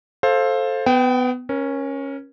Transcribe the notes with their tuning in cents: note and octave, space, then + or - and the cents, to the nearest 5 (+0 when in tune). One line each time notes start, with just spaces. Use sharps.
A4 -5 C5 +15 F5 +0
B3 +20 G5 -15
C#4 -10 A#4 +30